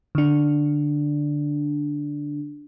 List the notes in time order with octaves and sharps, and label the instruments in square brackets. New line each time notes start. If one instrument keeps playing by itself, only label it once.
[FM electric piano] D3 D4